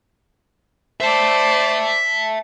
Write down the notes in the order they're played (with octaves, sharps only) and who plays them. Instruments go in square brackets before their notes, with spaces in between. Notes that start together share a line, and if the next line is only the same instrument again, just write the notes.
[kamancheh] C5 D5 [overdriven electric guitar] E5 A5